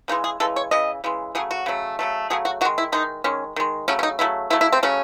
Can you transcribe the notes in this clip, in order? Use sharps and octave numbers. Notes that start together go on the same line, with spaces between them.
C#3 E3 G#3 D#4
G#4
C#3 E3 G#3 A4
C#5
C#3 E3 D#5
C#3 E3 G#3
C#3 F#3 A3 G#4
F#4
C#3 F#3 A3
C#3 F#3 A3
C#3 F#3 A3 G#4
F#4
D#3 G#3 F#4
E4
D#3 G#3 D#4
D#3 G#3 C#4
D#3 G#3
C#3 F#3 A3 C#4
C#4
D#4
C#3 F#3 A3 E4
C#3 F#3 A3 E4
E4
C4
C#3 F#3 A3 C#4